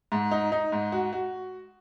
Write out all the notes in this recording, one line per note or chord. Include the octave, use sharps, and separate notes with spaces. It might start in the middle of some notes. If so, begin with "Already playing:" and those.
G#2
D#4
D#4
G#2
F#4
F#4